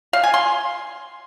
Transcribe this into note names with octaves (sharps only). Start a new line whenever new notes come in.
F5
G#5
C6